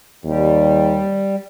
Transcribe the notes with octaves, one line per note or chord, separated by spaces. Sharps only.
D#2 G3